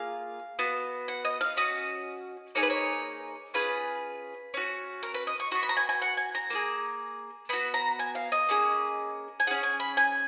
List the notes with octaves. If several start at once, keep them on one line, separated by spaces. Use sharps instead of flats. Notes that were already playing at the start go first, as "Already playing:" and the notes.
Already playing: A#3 F4 G#4 F5
B3 F#4
F#5
D#5
F5
C#4 F#4 D#5
A#3 D#4 G#4 C#5
B4
C#5
C#4 F4 G#4 B4
C#4 F#4
A#4
B4
D#5
C#6
B3 F#4 C#6
B5
A#5
G#5
G#5
F#5
G#5
A#5
A#3 F4 G#4
B3 F#4 B5
A#5
G#5
F5
D#5
A#3 C#4 G#4
G#5
C#4 G#4 F#5
G#5
B5
G#5